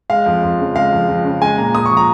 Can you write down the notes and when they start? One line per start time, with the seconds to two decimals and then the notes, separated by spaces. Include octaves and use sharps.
0.10 G#3 F5
0.26 F2
0.43 F2
0.59 C#3
0.76 G#3 F5
0.92 F2
1.08 F2
1.25 C#3
1.42 G#3 G#5
1.58 A#2 A#5
1.75 A#2 D#6
1.86 C#6
1.91 F3
1.97 A#5